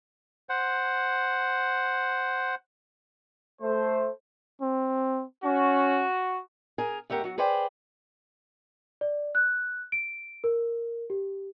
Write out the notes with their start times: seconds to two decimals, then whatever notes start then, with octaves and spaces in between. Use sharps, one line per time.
0.49 C5 F#5
3.61 A3 C5
4.61 C4
5.45 C#4 F#4
6.78 G#4 A#4 G#5
7.10 E2 A3 G4 A#4 F#5
7.24 F#3 F#4
7.38 G#4 B4 C5 D5 G5
9.01 D5
9.35 F#6
9.92 D7
10.44 A#4
11.10 G4